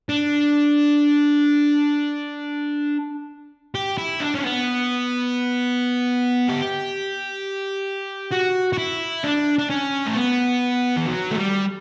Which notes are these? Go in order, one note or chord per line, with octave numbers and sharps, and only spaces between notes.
D4
G4
E4
D4
C#4
B3
G4
F#4
F#4
E4
D4
D4
C#4
A3
B3
E3
F#3
A3
G3